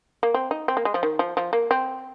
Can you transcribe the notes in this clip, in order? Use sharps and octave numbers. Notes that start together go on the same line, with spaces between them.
A#3
C4
D#4
C4
A#3
G#3
F3
D#3
F3
F3
A#3
C4